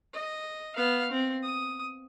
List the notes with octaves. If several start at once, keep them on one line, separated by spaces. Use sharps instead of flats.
D#5
B3 F5
C4
D#6